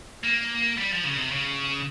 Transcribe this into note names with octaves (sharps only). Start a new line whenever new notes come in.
A#3
G3
F3
C#3
C3
C#3